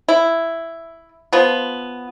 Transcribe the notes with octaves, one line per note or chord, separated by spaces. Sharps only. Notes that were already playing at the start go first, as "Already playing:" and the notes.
E4
F3 B3